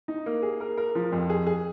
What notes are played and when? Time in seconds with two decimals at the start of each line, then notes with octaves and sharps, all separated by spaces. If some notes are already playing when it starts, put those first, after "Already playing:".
0.08 D#4
0.26 A#3
0.42 G#4
0.60 A#4
0.77 A#4
0.95 F3
1.12 F2
1.30 G#4
1.47 G#4